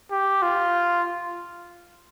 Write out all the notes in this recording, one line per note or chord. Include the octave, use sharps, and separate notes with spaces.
G4
F4